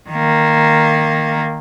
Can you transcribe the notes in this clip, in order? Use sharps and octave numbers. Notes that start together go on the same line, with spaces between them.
D#3 A#3